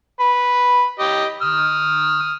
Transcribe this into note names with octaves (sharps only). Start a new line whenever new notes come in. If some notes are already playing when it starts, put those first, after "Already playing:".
B4
G4 D#5
D#6 F6